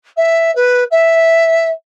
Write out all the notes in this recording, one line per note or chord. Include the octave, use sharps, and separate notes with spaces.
E5
B4
E5